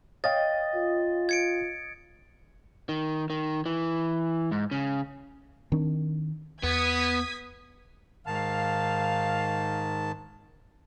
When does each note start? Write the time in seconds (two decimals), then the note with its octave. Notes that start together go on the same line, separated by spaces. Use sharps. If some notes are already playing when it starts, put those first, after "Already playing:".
0.24 C#5 D#5 F5 G5 A6
0.76 F4
1.29 G#6 C#7 D7
2.89 D#3
3.30 D#3
3.66 E3
4.51 G#2
4.71 C#3
5.72 D#3 C4 D4
6.63 E2 B3 D#6 G#6 B6
8.27 G#2 D#3 F5 A5